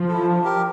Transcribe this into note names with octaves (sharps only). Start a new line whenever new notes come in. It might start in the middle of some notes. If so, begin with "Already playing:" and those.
Already playing: F3
E4 A4
D4
G4 A#4